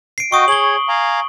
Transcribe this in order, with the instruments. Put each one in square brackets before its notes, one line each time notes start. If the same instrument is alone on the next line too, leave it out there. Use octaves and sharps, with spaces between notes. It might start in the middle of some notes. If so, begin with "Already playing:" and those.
[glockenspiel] C7 D7
[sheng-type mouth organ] F#4 D#5 G5 [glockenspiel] C#6 D#6
[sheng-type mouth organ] G#4 C#5 [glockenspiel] F#7 G7
[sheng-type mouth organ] F5 G#5 A#5